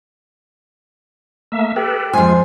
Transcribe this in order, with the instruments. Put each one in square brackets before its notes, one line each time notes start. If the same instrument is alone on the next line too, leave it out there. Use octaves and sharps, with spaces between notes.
[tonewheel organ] A3 A#3 E5
[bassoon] G4 [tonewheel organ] A4 B4
[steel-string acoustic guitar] F2 G#5 [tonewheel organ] G#3 F4 [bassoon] C5